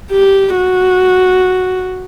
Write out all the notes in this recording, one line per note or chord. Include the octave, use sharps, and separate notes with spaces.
G4
F#4